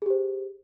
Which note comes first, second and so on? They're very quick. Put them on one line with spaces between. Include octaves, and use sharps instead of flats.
G#4 G4 C5